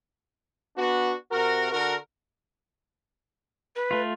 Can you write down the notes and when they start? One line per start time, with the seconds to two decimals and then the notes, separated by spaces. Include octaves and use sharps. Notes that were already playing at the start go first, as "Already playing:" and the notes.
0.76 B3 D4 F#4
1.31 C3 F#4 A#4
1.72 D3 F#4 A#4
3.76 B4
3.91 A3 F4